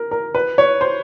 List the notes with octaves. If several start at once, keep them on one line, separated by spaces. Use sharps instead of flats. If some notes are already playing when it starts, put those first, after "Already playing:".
Already playing: A#4
A#4
B4
C#5
C5